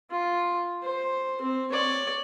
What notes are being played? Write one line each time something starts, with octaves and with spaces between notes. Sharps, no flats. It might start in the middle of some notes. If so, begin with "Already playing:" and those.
F4
C5
C4
C#5 D5